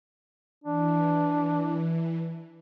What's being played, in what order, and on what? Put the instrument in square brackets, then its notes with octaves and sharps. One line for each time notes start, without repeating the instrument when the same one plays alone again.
[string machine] E3 [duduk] D4